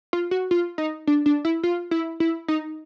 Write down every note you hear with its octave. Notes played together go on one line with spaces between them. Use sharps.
F4
F#4
F4
D#4
D4
D4
E4
F4
E4
E4
D#4